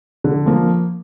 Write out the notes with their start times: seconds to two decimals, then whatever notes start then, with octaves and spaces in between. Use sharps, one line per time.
0.24 D3
0.46 F3 A#3